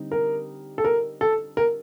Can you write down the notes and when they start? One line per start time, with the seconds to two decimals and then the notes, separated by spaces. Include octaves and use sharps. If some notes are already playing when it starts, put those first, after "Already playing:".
Already playing: D3 G3 C4 D#4
0.12 A#4
0.78 A4
0.85 A#4
1.21 A4
1.57 A#4